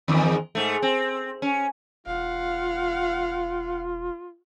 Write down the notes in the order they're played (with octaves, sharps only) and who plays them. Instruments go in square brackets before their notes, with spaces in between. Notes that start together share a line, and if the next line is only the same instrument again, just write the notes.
[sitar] E2 G#2 D#3
G#2 A3
C4
C#4
[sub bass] E1 [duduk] F4 [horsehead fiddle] F5 F#5